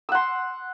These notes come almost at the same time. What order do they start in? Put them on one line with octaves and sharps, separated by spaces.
E6 F#5 C6